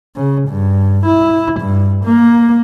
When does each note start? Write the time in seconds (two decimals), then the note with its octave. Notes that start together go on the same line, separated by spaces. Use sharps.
0.15 C#3
0.49 G2
1.06 E4
1.60 G2
2.05 A#3